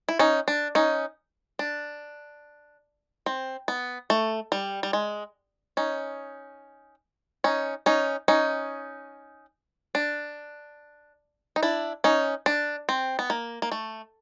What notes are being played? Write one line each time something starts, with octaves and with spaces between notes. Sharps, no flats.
E4
C#4 D#4
D4
C#4 D#4
D4
C4
B3
A3
G3
G3
G#3
C#4 D#4
C#4 D#4
C#4 D#4
C#4 D#4
D4
D#4
D4 E4
C#4 D#4
D4
C4
B3
A#3
A#3
A3